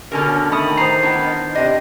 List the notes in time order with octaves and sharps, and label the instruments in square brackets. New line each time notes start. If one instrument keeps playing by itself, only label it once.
[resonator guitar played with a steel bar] B2 D3 A#4 [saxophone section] C#4 A4
[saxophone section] D#3 [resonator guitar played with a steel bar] A3 [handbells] B5 D#6
[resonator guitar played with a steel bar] A2 A#5 [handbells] C5 C7
[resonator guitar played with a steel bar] B3 D4 E4
[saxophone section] C3 D4 [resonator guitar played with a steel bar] D#5